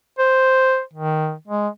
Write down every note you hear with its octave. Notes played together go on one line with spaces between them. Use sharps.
C5
D#3
G#3